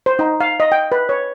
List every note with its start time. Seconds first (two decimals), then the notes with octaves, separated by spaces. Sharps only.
0.06 C5
0.19 D#4
0.40 F5
0.60 D#5
0.72 G5
0.92 B4
1.09 C#5